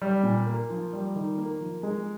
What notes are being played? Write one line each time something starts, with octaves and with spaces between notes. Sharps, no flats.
G3
A#2
A#3
F3
G3
D#3
A#3
F3
G#3